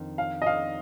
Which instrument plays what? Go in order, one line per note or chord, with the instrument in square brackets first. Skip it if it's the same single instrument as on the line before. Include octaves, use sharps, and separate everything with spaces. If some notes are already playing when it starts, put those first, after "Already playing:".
Already playing: [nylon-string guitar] F2 D#3 D4
[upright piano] F5
D#5
F5